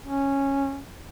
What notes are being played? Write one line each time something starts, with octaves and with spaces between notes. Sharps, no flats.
C#4